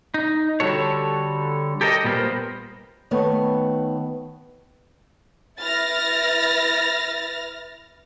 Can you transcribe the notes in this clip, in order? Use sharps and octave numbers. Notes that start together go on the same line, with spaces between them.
D#4
D3 G3 F#4 A4 C#5
G4 A4 A#4 C#5 D#5
A#2 G3 A3 B3 A#4 C5
D#3 A3 B3 B4 C#5
E4 B4 F6 A6 A#6